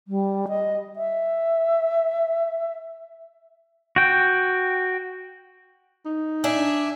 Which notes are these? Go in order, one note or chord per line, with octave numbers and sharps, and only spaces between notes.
G3
D#5
E5
F#4 G5
D#4
D4 E5 G#5